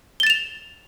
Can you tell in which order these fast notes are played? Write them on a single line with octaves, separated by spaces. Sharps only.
G7 A6 E7 F7